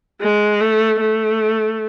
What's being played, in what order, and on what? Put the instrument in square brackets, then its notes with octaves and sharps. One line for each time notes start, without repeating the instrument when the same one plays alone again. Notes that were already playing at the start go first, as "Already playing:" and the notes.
[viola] G#3
A3
A3